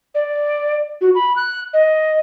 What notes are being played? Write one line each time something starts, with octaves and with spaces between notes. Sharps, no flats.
D5
F#4
B5
F#6
D#5